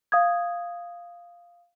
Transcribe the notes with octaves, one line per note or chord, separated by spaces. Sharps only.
F5 D#6 G#6